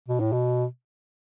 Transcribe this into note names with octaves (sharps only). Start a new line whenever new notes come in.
B2
A2
B2